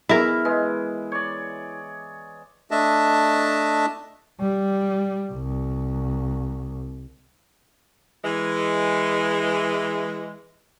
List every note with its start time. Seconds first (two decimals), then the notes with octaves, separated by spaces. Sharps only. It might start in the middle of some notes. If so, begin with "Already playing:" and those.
0.09 E3 B3 E4 G#4 A#4
0.45 G#3 B4
1.12 C#5 D5
2.71 A3 D4 D#5 E5 A5
4.41 G3
5.32 C2
8.23 E3 G#3